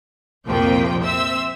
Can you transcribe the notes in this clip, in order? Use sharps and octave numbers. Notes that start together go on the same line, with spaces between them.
C2 F2 A#2 F3 A#3 G5
C4 E5 E6